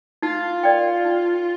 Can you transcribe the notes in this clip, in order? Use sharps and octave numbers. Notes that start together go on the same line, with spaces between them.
D#4 F4
A#4 D5 G5
D#4